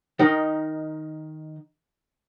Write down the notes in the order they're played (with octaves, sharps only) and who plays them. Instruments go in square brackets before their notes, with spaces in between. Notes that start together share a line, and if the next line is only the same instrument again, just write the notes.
[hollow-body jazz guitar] D#3 D#4 A#4 D#5